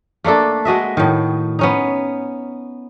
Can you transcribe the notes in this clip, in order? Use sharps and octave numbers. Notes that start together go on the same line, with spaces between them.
A3 A#3 D4 A4
G#3 F#4 D#5 E5
A2 D#3
B3 C#4 D#4